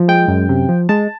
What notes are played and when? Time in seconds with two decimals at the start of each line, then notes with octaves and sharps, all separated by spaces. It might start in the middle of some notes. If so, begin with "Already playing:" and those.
Already playing: F3
0.08 G#3 G5
0.28 F#2
0.49 C3
0.69 F3
0.89 G#3 A5